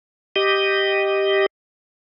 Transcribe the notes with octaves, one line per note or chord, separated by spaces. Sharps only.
G4 D#5